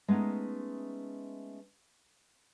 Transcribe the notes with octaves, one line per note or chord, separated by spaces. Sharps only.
G#3 A3 B3 C#4 D#4